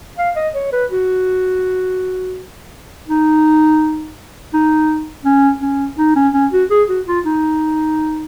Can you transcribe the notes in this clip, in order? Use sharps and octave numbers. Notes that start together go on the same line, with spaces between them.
F5
D#5
C#5
B4
F#4
D#4
D#4
C#4
C#4
D#4
C#4
C#4
F#4
G#4
F#4
F4
D#4